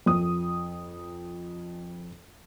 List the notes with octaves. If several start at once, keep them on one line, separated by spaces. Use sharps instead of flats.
F2 D#6